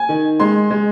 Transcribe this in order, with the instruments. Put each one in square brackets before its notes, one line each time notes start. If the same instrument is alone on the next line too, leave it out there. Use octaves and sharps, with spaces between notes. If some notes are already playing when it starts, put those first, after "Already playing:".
Already playing: [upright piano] G#5
D#3
G#3 C6
G#3